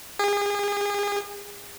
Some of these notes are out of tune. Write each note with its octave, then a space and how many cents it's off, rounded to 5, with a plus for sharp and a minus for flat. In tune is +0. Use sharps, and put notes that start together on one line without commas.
G#4 -35